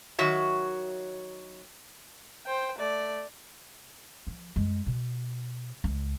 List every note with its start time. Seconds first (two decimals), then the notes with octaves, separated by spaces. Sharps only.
0.19 D#3 F#3 F#4 C#5 E5
2.47 C5 G5
2.79 A3 D5
4.27 F3
4.56 F#2 G#3
4.86 B2
5.84 C#2